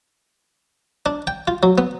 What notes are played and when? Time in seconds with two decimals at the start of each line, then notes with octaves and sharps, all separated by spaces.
1.06 D4
1.27 G5
1.48 F4
1.63 F#3
1.78 B3